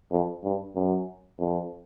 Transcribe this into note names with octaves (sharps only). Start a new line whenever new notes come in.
F2
G2
F#2
F2